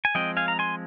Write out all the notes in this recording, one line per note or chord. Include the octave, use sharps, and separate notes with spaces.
G#5
F3 G#3 C4 D#5 G5
F5 G#5
A#5
G#5 C6